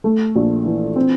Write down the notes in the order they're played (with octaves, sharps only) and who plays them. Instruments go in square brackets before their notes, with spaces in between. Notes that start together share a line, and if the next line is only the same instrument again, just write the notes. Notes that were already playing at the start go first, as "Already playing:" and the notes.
[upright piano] A3
A#1
E3
C4